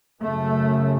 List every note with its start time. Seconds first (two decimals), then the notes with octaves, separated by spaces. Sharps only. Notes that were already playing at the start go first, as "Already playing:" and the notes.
0.22 F#2 C#3 A3